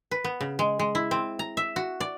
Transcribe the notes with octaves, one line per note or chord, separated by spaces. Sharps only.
B4
B3
C#3
G#3
G#3
E4
C4
A#5
E5
F#4
D5